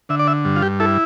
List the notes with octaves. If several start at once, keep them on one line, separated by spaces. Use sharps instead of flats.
D3 E5
D5
E5
G2
F4
G4
E4 A4